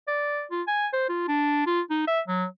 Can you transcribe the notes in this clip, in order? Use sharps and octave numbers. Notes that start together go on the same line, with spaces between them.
D5
F4
G#5
C5
F4
D4
F4
D#4
E5
F#3